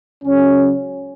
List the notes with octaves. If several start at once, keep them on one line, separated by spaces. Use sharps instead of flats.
C#2 C#3 F#3 C#4